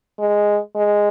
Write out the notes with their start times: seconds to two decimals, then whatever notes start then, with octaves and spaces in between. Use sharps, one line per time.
0.19 G#3
0.75 G#3